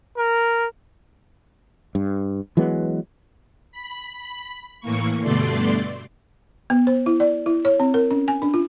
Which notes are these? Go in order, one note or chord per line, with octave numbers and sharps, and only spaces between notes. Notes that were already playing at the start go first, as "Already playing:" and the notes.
A#4
G2
E3 F#3 G#3 B3
B5
A2 E3 A#3 C#6
G2 B2 D3 A3 D5 C6
B3
C5
E4
D5
E4
C#5
C4
A#4
C#4
G#5
D4
F4